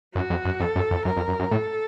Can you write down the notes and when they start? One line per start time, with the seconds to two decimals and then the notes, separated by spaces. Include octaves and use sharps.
0.15 F#2 F#4
0.30 F2
0.45 F#2
0.60 F2 A4
0.76 F#2
0.91 F2
1.05 F#2 A#4
1.16 F2
1.28 F#2
1.39 F#2
1.51 A2 A4